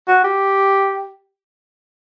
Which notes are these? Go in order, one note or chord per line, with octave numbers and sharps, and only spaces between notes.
F#4
G4